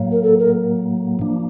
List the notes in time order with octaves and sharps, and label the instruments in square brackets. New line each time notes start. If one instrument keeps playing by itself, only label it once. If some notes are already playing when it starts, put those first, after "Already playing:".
Already playing: [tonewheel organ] A2 F#3 A#3
[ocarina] A#4
A4
A#4
[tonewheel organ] F3 A#3 D4